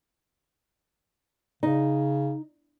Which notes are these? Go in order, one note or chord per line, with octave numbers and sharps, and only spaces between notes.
C#3 D#4